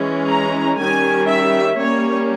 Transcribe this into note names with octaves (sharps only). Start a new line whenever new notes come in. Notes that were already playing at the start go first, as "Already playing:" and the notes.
Already playing: E3 G#3 C#4
A#5
D#3 G3 C#4 G#5
E5
G3 A#3 C#4 C#5